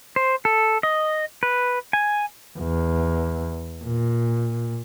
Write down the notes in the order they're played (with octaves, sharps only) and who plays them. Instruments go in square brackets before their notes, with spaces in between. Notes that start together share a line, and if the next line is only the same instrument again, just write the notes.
[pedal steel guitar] C5
A4
D#5
B4
G#5
[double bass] E2
A#2